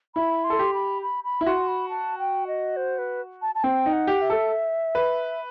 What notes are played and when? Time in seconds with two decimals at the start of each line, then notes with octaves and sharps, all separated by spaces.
0.15 E4 B5
0.44 C6
0.50 A4
0.59 G4
0.74 B5
1.02 B5
1.24 B5
1.41 E4
1.46 F#4 C6
1.68 B5
1.89 A5
2.19 G5
2.47 D#5
2.76 C5
2.98 B4
3.42 A5
3.55 A5
3.64 C4 G5
3.86 D#4
3.93 F#5
4.07 G4
4.22 E5
4.30 A4
4.95 B4